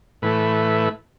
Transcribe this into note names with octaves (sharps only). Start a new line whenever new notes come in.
A2 E3 A3 B4